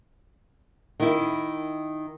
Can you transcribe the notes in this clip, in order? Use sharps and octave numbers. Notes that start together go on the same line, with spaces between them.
D#3 E4